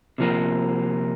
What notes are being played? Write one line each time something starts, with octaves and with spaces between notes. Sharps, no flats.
C3 F3 A#3